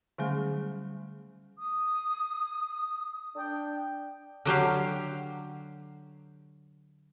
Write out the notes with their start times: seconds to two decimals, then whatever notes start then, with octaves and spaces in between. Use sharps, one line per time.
0.18 D3 F#3 G3 A3 C#4 G#4
1.58 D#6
3.36 D4 G5
4.45 D3 F#3 G4 F5